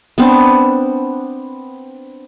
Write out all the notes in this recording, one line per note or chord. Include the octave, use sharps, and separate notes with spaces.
B3 C4 D4